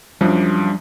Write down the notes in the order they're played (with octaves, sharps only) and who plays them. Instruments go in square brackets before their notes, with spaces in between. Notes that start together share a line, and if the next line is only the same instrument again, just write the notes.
[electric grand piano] F#2 F3 [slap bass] G3 D4